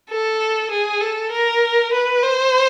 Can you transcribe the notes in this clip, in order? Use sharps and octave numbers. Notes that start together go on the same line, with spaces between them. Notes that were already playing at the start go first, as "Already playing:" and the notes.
A4
G#4
A4
A#4
B4
C5